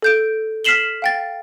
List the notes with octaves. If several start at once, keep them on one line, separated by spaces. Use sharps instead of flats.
A4 G6 D7
F6 B6 C7 E7 F#7 G7
F5 G5 A6